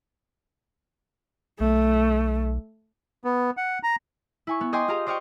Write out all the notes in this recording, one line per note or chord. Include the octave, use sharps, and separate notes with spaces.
B1 A3
B3
F#5
A#5
E4 G#5 C#6
B3
D#5 G5 G#5 C6 D6 D#6
F4 G4 G#4 F5 A#5
C5 D5 D#5 F5 G5 C#6